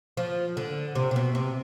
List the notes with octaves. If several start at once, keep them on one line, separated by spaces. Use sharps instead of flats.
F3
D3
C3
C3
B2
C3